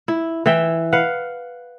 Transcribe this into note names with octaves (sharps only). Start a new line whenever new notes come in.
E4
E3 E4 E5 G5
B4 F5 F#5